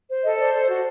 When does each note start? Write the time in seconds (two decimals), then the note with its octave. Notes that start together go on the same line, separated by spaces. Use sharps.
0.09 C5
0.24 A4 D#5
0.39 C5 D5
0.54 A4
0.69 F#4